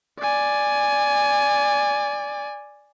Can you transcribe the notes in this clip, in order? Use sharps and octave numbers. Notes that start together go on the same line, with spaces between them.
D5 G#5